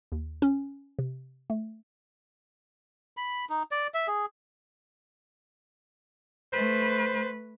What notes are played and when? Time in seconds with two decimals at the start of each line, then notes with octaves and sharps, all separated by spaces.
0.12 D#2
0.42 C#4
0.99 C3
1.50 A3
3.17 B5
3.50 D#4
3.71 D5
3.94 E5
4.08 G#4
6.53 A3 B4 C5